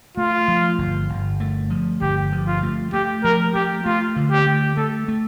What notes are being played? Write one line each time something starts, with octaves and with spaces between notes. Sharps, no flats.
A3 F4
F3
G1
G1
A3
F3
G1 G4
F3
F4
A3
A3 G4
F3 A#4
A3 G4
A3 F4
D3
G4
A3
A3 A4
A3